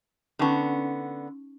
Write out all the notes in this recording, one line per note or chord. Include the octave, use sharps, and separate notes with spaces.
D3 B3 C#4 D#4 C#6